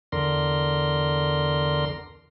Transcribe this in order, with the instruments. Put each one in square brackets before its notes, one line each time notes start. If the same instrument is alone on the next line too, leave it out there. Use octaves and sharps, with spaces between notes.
[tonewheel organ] E2 D3 A#4 C6